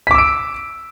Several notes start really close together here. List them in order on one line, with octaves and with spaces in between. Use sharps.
B6 D6 E6 D7